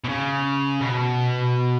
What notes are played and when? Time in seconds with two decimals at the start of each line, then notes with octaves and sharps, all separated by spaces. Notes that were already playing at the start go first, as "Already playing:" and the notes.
0.04 B2
0.09 C#3
0.81 B2